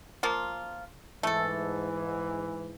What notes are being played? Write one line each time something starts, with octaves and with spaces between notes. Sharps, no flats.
F3 A#3 F4
G#2 E3 A3 A4